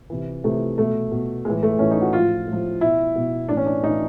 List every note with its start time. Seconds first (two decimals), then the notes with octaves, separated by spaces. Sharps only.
0.10 C3 E3
0.44 C3 E3 A3
0.78 B2 A3
1.12 B2
1.45 A2 E3 G#3
1.63 A3
1.79 A2 E3 C#4
1.91 D#4
2.02 F#4
2.13 A2 F4
2.18 F3
2.47 A2 F3
2.81 B2 E4
3.16 B2
3.48 A2 E3 D4
3.57 C#4
3.66 D4
3.82 A2 D#4
3.87 E3